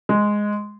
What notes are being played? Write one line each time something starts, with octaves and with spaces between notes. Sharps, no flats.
G#3